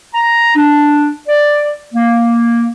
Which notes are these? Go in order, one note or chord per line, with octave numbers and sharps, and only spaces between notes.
A#5
D4
D5
A#3